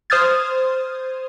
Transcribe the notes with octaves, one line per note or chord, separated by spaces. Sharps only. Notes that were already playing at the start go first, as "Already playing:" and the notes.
C5 D#6 F6 G#6 A6